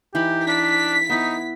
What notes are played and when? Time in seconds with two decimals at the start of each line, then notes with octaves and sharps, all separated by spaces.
0.15 E3 D#4 G4 B5
0.47 D4 B6
1.10 B3 D#4 E4